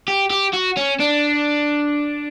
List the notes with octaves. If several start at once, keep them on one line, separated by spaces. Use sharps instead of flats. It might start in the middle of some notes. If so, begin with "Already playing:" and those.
G4
G4
F#4
C#4
D4